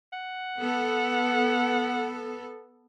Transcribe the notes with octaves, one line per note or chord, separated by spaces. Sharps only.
F#5
B3 A4